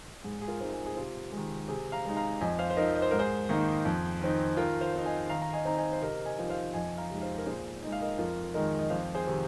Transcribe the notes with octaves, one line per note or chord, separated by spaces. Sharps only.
G#2 G#4
G#4
F4 A#4
G#3 C4 D#4
G#4
G#4
C3 F4
D#3 G#3
C3 G#4
F5 A#5
G#3 D#4
F5 A#5
F2 D#5 G#5
C5 F5
C5
F3 C4 D#4 A#4 D#5
D#5
C5
G#2 A#4
G#4 C5
D#3 A#3 D#4
F2
D#3 C4 D#4
D#3 F4 A#4
C5 F5
C4 D#4
D#5 G#5
D#3 F5 A#5
A#5
D#5 G#5
C4 D#4 A#5
D#5 G#5
C5
C3 A#4 D#5
D#5 G#5
F3 C4 D#4
C5 F5
F2 D#5 G#5
F5 A#5
C3 G#3 D#4
C5 F5
A#4
A#2 G#4 C5
G#3 D#4 D#5
F5
A#4 D#5
F2 F4 A#4
D#3 G#3 D#4 A#4 D#5
D#5
F2 C5 F5
G#4 C5
C3 D#3